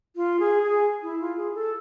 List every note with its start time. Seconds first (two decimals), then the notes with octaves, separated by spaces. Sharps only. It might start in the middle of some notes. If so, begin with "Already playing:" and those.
0.16 F4
0.40 G#4
0.63 G#4
1.03 E4
1.20 F4
1.37 G#4
1.55 A4